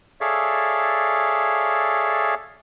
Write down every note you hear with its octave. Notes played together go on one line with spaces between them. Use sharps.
G#4 A4 C#5 D5 E5 F5